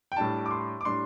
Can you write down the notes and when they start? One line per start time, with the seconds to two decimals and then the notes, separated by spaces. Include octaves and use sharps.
0.12 G5
0.16 A2 G3 D4 A5
0.46 D6
0.51 C6
0.81 D6
0.85 A2 G3 D4 C6